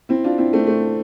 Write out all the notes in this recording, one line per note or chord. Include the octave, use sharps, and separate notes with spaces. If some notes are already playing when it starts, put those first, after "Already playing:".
C4 E4
D4 F4
C4 E4
A3 C4
A3